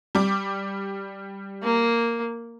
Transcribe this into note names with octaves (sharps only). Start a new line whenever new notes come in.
G3 D6
A#3